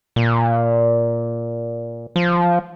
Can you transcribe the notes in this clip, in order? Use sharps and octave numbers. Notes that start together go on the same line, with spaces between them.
A#2
F3